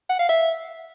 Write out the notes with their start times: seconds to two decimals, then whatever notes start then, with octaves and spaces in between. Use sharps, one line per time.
0.09 F#5
0.19 F5
0.29 E5